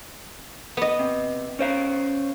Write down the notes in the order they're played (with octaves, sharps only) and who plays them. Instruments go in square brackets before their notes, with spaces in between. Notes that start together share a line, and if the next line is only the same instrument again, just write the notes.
[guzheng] B3 D#5
[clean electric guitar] C3
C#4 C5 F5